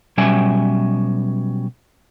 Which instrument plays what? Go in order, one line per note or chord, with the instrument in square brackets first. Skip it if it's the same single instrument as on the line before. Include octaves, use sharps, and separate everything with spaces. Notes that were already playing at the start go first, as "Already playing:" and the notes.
[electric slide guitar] B2 F#3 G3 C#4 E5 G#5